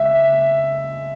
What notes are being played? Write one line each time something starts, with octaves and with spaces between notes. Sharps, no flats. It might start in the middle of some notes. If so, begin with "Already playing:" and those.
Already playing: C#3 G#3 E5